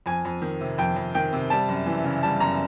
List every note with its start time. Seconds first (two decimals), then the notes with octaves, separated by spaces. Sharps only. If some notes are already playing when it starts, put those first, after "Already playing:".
0.06 F2 G#5
0.25 F2
0.42 D#3
0.61 C3
0.78 F2 G5
0.96 F2
1.14 D#3 G5
1.33 C3
1.50 G3 A5
1.69 F#2
1.86 E3
2.04 C#3
2.23 G3 A5
2.40 F#2 A#5